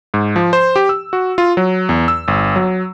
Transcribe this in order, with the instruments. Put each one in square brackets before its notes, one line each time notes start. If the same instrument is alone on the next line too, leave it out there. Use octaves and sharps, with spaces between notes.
[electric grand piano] G#2
F3
C5
G4
E6
F#4
F4
F#3
E2
E6
G1
F#3